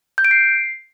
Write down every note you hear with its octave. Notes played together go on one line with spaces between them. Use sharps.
G6
D7
C7